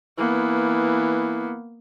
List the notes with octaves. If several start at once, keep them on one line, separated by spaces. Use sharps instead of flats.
E3 A#3 B3